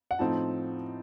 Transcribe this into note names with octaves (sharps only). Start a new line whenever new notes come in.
F#5
A2 F3 C4 D#4 A5